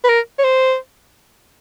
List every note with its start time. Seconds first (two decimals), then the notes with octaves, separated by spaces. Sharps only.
0.04 B4
0.09 A#4
0.39 C#5
0.44 C5